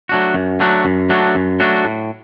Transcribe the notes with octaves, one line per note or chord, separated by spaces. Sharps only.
F#3 A3 D4 F#4
F#2
F#3 A3 D4 F#4
F#2
F#3 A3 D4 F#4
F#2
F#3 A3 D4 F#4
A2